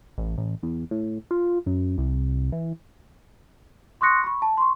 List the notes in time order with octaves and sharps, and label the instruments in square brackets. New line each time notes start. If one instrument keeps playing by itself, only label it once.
[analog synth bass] A1
A1
E2
A2
F4
F#2
C2
E3
[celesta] C6 C#6 D#6 F#6 A#6 C#7
B5 C#6
A5
C6 C#6